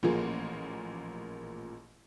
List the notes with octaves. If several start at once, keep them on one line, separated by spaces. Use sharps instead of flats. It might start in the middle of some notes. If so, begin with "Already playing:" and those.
A1 A#2 F3 A#3 G#4